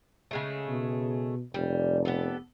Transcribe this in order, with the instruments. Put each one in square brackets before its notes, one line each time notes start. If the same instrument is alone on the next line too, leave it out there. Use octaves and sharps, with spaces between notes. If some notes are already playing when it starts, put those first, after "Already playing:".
[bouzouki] C#3 G#3 A3
[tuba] B2
[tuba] F1 [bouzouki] G3
[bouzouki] B3 G4 A4